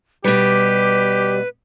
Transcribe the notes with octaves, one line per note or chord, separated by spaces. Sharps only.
B2 G3 G4 B4